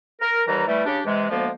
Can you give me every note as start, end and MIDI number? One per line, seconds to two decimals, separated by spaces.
0.21 0.43 70
0.48 0.62 39
0.48 0.62 52
0.48 0.62 55
0.48 0.62 82
0.68 0.85 52
0.68 0.85 55
0.68 0.85 57
0.86 1.01 49
0.86 1.01 62
0.86 1.01 67
1.06 1.29 48
1.06 1.29 52
1.06 1.29 56
1.30 1.50 38
1.30 1.50 53
1.30 1.50 56
1.30 1.50 58
1.30 1.50 59